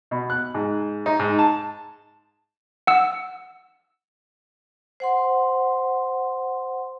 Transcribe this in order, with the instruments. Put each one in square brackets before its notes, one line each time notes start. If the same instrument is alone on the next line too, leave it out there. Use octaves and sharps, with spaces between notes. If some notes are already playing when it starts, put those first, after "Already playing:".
[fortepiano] B2
F#6
G#2
D#4
G#2
A5
[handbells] F#5 E6
[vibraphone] C5 F#5 C6